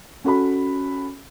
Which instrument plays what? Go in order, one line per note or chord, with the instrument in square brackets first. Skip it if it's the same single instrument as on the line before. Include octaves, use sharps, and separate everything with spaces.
[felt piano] C#4 F#4 A4 B5